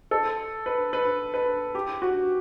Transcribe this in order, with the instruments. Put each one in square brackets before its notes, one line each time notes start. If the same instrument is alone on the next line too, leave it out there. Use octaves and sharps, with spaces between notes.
[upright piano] A4
B4
B4
B4
G4
F#4